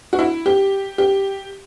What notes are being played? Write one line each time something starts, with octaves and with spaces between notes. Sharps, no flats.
F#4
E4
G4
G4